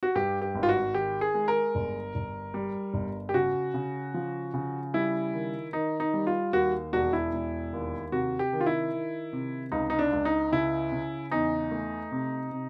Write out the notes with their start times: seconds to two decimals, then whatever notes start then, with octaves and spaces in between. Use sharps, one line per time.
0.03 F#4
0.15 G2 G4
0.42 G4
0.55 G#1
0.63 F4
0.69 F#4
0.94 D#3 G4
1.21 G#4
1.34 G#3
1.48 A#4
1.75 G1
2.15 G1
2.54 G3
2.94 G1
3.29 G4
3.34 C#3 F#4
3.74 C#3
4.14 F3
4.54 C#3
4.94 G3 E4
5.34 D#3
5.73 D#3 D#4
6.00 D#4
6.14 G3
6.27 F4
6.53 D#2 F#4
6.93 E1 F#4
7.13 E4
7.33 E1
7.73 D#2
8.12 C3 F#4
8.39 G4
8.53 D#3
8.61 F4
8.66 E4
8.93 D#3
9.33 C3
9.72 C#2 D#4
9.90 D#4
9.99 D4
10.13 C#2
10.25 D#4
10.52 C#3 E4
10.92 C#3
11.31 E2 D#4
11.71 A3
12.11 C3
12.51 C3